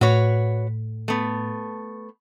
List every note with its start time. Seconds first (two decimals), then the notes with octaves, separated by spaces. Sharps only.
0.01 A2 F#4 B4 C#5
1.08 A3 B3